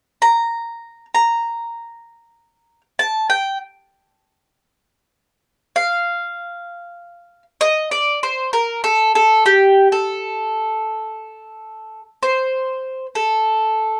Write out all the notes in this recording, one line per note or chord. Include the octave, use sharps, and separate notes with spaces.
A#5
A#5
A5
G5
F5
D#5
D5
C5
A#4
A4
A4
G4
A4
C5
A4